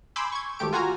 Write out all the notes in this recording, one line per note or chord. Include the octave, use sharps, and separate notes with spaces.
G#5 B5 C6 D6 E6 G6
C#6 G#6
G#1 A3 G4 D7
F4 F#4 G#5 A#5